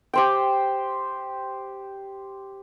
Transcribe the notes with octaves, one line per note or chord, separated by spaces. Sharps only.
G4 C5 G5